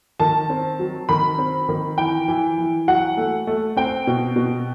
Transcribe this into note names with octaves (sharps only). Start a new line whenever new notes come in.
D#3 A5
C4
F#3
D#3 B5
C4
D#3
E3 G5
E3
E3
F#3 F#5
A3
A3
C4 G5
B2
B2